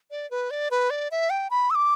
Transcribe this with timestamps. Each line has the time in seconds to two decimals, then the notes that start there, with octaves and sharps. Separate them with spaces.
0.11 D5
0.31 B4
0.51 D5
0.71 B4
0.90 D5
1.11 E5
1.30 G5
1.50 B5
1.70 E6
1.75 D6